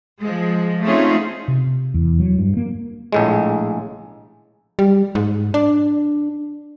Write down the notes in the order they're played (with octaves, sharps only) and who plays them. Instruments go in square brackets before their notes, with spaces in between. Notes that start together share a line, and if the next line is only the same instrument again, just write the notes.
[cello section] F3 G#3
A3 C4 C#4 D#4 F4 G#4
[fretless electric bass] C3
E2
F#3
G2
A#3
[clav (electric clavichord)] A#1 A2 G#3
[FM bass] G3
G#2
D4